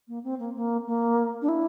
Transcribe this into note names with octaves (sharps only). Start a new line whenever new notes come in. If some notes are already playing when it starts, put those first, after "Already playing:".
A#3
C4
A#3
A#3
A#3
D4
E4